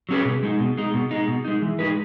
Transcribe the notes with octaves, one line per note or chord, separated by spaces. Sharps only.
F#3 C#4 G#4 B4
B2
G#3 D#4
B2
G#3 D#4
B2
G#3 D#4
B2
G#3 D#4
E3
G#3 D#4 G#4 B4